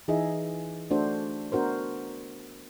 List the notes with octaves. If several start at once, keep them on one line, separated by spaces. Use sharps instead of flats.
E3 D#4 G#4 D#5 E5
A3 D4 F#4 A4 C5
B3 D4 F#4 A#4 C5